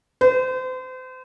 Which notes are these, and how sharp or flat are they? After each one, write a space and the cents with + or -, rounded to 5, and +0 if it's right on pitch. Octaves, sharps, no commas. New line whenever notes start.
C5 -35